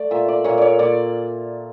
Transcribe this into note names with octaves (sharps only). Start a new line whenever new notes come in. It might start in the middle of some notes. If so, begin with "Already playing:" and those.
Already playing: A3 D5
A#2 E5
D5
A#2 C#5
C#5 D5
A#2 D5